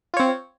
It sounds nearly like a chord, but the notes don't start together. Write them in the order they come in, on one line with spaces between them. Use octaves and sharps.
F4 C#5 C4